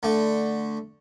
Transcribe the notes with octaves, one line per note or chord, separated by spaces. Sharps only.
D3 A3